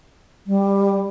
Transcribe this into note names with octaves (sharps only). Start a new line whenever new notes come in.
G3